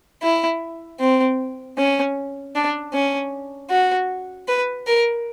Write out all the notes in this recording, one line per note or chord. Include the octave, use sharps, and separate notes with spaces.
E4
C4
C#4
D4
C#4
F#4
B4
A#4